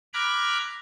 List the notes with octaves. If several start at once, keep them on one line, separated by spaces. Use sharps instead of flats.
A#5 B5 D6 F6 F#6 G#6